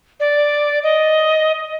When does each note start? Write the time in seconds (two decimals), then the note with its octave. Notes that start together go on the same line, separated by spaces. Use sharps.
0.20 D5
0.83 D#5